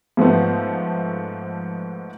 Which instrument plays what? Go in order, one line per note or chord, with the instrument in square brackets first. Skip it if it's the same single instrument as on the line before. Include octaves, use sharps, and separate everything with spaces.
[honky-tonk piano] G#2 F3 A3 B3